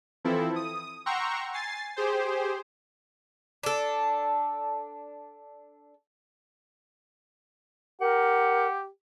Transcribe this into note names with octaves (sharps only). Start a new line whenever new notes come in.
E3 F3 C4 E4 A4
D#6
F#5 G5 A#5 C6 C#6 E6
G#5 A6 C7
G4 G#4 C5
D4 A4
G4 A#4 F#5